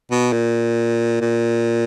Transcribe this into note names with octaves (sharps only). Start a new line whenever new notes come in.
B2
A#2
A#2